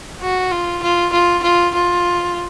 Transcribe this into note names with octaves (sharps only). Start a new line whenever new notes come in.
F#4
F4
F4
F4
F4
F4